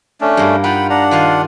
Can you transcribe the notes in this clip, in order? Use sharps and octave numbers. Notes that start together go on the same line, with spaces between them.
A3 C#4 D4
G2 A#3
D#4 F4 F#5 G5 B5
D4 F#5 A#5
D#3 F4 D#5 F5